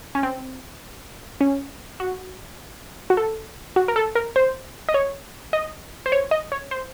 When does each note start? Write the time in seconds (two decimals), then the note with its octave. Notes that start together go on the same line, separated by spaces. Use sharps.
0.15 C#4
0.23 C4
1.41 C#4
2.00 F#4
3.10 F#4
3.17 A4
3.76 F#4
3.88 A#4
3.96 A4
4.15 A#4
4.36 C5
4.89 D#5
4.94 C#5
5.53 D#5
6.06 C5
6.12 C#5
6.31 D#5
6.52 C#5
6.71 C5